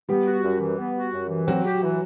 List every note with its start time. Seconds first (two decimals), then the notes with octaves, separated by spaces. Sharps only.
0.09 G3 B3 G4
0.26 F#4
0.44 F#2
0.60 E3
0.79 B3
0.95 F#4
1.13 F#2
1.30 E3
1.47 F#3 C4 F#4
1.65 G4
1.82 E3